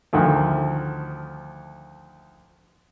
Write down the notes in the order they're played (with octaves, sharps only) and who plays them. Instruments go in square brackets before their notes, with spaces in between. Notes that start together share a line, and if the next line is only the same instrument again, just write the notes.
[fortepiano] D2 D#3 F3 A3